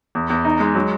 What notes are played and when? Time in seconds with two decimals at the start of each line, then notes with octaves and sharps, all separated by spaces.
0.15 E2
0.30 E2
0.45 D#4
0.60 G#3
0.75 F#3